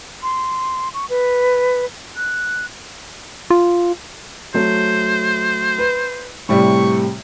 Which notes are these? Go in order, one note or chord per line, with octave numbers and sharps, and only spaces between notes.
C6
C#6
B4
F#6
F4
F#3 A3 C5
B4
A2 C3 G3 C#6